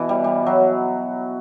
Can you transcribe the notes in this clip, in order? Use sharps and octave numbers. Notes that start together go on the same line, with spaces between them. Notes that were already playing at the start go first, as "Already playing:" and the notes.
Already playing: B2 E3
G3
G3
F#3